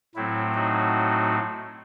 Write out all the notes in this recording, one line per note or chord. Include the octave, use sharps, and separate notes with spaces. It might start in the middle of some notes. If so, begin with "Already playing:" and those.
A2 F#3 A3 C4 E4
D#4 F#4